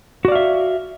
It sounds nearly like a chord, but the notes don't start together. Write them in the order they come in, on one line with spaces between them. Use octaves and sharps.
F#4 D5 F5 E5